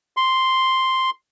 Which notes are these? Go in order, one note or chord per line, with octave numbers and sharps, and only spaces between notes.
C6